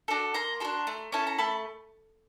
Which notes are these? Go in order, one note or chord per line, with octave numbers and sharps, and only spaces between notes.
D4 F#4 A4
A#3 A#5 C6
D4 F#4 A4 A#5 C6
A3
C#4 E4 A4 A5
A#5
A3 A5 B5